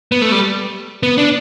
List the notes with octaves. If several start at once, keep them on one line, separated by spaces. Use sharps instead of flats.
B3
A3
G3
B3
D4